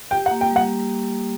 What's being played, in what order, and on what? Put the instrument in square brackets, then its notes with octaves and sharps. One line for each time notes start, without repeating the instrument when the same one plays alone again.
[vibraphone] G4 [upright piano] G5
[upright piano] F#5
[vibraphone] A#3
[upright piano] G5
[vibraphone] G3
[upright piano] F#5